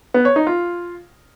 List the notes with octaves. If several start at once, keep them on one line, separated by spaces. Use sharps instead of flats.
B3
C#5
D#4
F4